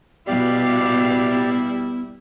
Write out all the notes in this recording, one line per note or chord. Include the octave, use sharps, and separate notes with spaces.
B2 G3 B3 E4 G4 D5 F5